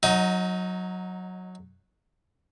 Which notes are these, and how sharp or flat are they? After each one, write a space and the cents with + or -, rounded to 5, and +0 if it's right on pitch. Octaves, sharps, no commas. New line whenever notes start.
F#3 -10 D#4 +0 D#5 +25